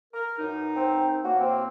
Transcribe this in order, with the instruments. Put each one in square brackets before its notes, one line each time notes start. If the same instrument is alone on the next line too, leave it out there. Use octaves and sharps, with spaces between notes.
[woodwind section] A#4
F#2 E3 D#4
[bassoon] C4
[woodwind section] A2 E3 A#3 [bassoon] F#4
[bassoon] C4